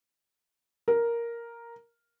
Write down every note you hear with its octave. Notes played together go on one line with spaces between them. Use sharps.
A#4